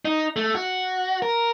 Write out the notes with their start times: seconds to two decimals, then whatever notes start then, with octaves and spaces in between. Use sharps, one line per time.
0.05 D#4
0.36 A3
0.55 F#4
1.22 A#4